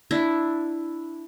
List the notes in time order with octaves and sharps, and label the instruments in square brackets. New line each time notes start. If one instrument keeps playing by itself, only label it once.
[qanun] D4 E4